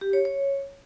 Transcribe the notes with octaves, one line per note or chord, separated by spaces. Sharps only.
G4
C#5
C#5